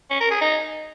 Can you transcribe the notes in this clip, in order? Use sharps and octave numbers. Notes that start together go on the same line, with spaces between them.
C#4
A#4
G#4
D#4